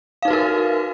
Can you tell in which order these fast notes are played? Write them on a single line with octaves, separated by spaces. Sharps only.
F5 D#4 B4 F#4 A#4